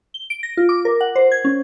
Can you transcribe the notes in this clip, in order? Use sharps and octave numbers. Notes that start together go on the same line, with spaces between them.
G7
D7
A#6
F4
D6
A#4
F#5
C5
G#6
C#4